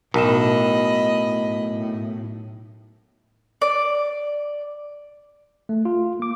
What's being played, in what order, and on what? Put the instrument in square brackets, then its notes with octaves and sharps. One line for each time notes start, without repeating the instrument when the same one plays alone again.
[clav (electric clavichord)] B1 [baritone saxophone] A2 [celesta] A#4 E7 [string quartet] D#5 B5
[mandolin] D5
[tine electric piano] A3
F4
A#3 D6